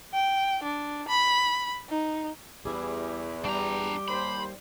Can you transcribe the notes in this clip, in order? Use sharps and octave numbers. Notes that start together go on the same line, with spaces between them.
G5
D4
B5
D#4
E2 G3 E4 G#4
G3 D4 G4 A#5
D#2 C5 B5